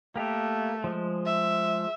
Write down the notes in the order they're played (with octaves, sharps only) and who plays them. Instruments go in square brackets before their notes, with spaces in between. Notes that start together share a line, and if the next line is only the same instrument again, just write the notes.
[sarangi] A3 [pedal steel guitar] A#3 G4
[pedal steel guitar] F3 G#3
[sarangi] E5